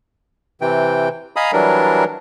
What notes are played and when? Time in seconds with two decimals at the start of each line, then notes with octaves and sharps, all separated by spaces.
0.61 C3 E3 G5
1.36 D#5 F5 G#5 A#5 B5 D#6
1.53 E3 F#3 G3 D4 A#4